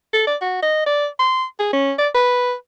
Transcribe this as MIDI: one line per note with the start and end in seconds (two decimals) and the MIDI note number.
0.13 0.22 69
0.27 0.36 74
0.41 0.59 66
0.62 0.86 75
0.86 1.07 74
1.19 1.44 84
1.59 1.70 68
1.73 1.93 61
1.99 2.09 74
2.14 2.54 71